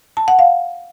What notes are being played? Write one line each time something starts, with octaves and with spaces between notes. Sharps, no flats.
A5
F#5
F5